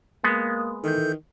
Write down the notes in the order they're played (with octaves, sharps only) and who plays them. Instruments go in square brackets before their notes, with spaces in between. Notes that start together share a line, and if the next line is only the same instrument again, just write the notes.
[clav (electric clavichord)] G#3 B3 [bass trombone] A#3
[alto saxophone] D#3 [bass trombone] E3 [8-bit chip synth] A4 G6